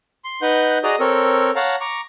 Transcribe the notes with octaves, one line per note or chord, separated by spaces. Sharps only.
C6
D#4 B4 F#5 G6
F#4 G#4 D5 D#5 A#5 D#6
C4 A4 A#4 C#5
C#5 F5 F#5 A5 A#5
A#5 C#6 D6